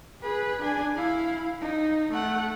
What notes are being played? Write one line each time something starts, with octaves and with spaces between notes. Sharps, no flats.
G#4 B4
D4 G#5
E4 F5
D#4
A3 F#5